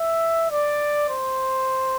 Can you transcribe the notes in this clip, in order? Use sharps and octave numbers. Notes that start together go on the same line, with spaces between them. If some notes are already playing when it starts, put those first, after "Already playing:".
Already playing: E5
D5
C5